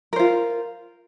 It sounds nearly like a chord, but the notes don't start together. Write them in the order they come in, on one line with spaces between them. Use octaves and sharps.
A#4 C5 F4